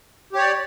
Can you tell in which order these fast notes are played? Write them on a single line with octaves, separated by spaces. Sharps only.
G4 C#5 D5